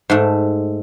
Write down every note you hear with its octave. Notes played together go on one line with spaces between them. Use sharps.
G#2 A3